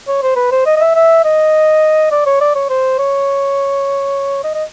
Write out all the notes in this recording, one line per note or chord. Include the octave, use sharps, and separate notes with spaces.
C#5
C5
B4
C5
D#5
D#5
E5
E5
D#5
D5
C#5
D5
C#5
C5
C#5
D#5
D#5